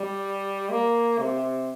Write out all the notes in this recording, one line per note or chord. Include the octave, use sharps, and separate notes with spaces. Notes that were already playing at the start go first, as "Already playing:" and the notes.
Already playing: G3
A#3
C3